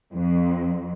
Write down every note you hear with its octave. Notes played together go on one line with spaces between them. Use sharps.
F2